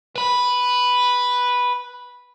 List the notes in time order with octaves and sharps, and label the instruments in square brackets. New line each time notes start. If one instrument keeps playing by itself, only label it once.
[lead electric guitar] B4 B5